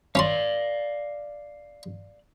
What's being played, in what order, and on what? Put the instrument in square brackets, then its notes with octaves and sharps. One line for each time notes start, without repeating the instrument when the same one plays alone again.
[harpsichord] C#4 B5 C6 [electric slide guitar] D5 F5